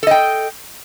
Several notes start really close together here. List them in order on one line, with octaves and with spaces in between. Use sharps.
A4 D#5 G5